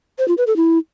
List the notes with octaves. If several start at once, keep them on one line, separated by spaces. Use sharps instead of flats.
C5
F4
B4
A4
E4